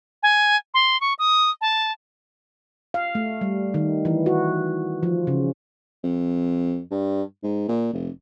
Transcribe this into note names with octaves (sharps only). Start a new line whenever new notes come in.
G#5
C6
C#6
D#6
A5
F5
A3
G3
D#3
E3
F#4
F3
C#3
F2
G2
G#2
A#2
F1